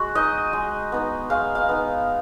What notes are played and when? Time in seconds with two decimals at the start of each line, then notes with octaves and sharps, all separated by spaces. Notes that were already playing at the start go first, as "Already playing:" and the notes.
Already playing: G#3 F#4
0.15 D#4 D#5
0.53 G#3
0.92 B3 D#4
1.30 G#3 F5
1.55 F5
1.69 B3 D#4